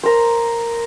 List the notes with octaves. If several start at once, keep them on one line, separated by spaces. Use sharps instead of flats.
A#4 C5